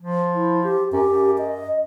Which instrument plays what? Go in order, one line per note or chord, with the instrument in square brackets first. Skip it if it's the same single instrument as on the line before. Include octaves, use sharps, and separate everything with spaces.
[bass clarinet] F3
[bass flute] E4
G4
[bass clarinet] F#2 [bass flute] G4
[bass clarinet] F#2
[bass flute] D#5